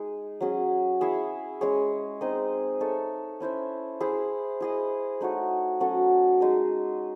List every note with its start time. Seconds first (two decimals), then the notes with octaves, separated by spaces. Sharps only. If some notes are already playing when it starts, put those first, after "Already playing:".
Already playing: G#3 D#4 G#4
0.40 F#3 C#4 G#4
1.01 E4 G#4 C#5 E5
1.61 G#3 C#4 G#4 C#5
2.21 C4 D#4 G#4 D#5
2.80 D#4 A4 C#5 E5
3.40 C#4 E4 C5 E5
4.00 E4 G#4 C5
4.60 E4 G#4 D#5
5.21 A3 D#4 F#4 C#5
5.80 F#3 C#4 F#4 A4
6.40 G#3 D#4 G#4 D#5